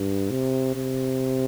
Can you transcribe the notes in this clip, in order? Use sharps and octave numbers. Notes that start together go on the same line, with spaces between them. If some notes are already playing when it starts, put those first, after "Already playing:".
Already playing: G2
C3
C3